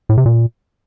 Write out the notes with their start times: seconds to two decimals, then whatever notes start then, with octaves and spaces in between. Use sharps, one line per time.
0.09 A2
0.17 C3
0.26 A#2